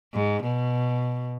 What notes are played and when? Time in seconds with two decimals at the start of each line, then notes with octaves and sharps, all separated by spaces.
0.14 G#2
0.43 B2